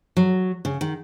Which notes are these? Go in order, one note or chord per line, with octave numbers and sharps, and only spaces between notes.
F#3
C#3
D#3